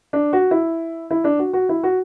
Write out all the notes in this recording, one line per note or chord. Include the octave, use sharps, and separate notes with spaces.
D4
F#4
E4
E4
D4
F#4
F#4
E4
F#4